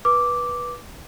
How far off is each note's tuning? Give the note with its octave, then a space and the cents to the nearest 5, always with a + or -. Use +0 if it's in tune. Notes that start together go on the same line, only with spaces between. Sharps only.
B4 -20 D6 -5